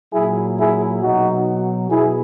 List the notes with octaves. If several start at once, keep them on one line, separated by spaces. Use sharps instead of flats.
A#2 F#3 E4 G#4
E4 G#4
B2 F#3 D#4 F#4
B2 E4 G#4